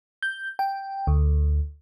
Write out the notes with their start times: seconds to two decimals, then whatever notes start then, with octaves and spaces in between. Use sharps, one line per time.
0.22 G6
0.59 G5
1.07 D2